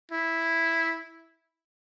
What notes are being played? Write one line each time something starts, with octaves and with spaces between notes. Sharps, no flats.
E4